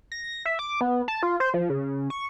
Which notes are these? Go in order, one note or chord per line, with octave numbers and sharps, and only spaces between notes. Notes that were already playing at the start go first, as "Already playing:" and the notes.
A#6
E5
D6
B3
A5
F4
C5
F3
C#3
C#6